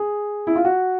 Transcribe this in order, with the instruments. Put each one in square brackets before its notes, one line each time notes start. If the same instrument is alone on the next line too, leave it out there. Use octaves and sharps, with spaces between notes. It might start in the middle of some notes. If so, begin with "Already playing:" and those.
Already playing: [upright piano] G#4
E4
F4
F#4